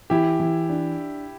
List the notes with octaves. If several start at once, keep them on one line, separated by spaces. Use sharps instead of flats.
E3 E4 G4
E3
D4